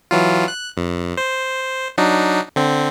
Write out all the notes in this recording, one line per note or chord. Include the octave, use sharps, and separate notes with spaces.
E3 F#3 F4
F#6
F2
C5
F#3 D4 D#4
D3 C4